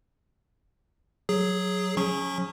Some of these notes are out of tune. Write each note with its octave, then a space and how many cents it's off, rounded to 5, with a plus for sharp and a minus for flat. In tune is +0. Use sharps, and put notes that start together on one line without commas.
F#3 +0 G#4 +0
F#3 -40 C#4 +0 C#6 -15